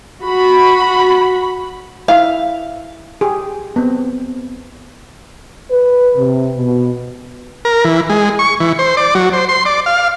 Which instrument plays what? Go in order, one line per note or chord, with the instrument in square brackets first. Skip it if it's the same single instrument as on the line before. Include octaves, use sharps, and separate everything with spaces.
[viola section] F#4 B5
[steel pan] E4 E5 [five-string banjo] F5
[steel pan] G4 G#4
B3 C4
[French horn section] B4
C3
B2
[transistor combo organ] A#4
E3
G#3
C#6
E3
C5
D5
F#3
C5
C6
D5
F5